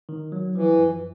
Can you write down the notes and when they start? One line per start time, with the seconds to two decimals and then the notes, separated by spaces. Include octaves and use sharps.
0.09 D#3
0.32 F#3
0.55 E3 F3
0.78 F#2